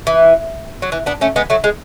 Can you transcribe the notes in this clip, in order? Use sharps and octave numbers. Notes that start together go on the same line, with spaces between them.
E3
F#3
E3
B3 D4
A3 C#4
G#3 B3
F#3 A3
G#3